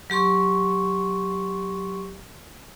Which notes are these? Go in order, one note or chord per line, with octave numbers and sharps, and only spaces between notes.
F#3 G4 C6 C#6